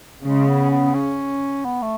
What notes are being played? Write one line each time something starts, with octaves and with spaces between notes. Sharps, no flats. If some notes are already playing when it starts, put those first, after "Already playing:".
C#3 G#3
B3
B3
C#4
B3
A3